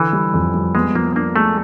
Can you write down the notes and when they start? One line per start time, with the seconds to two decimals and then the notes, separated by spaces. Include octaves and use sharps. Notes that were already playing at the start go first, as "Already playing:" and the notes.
Already playing: D3 E3
0.13 G3
0.34 F2
0.54 G3
0.75 G#3 B3
0.95 F3 A#3
1.15 A#3 D4
1.36 G#3 A3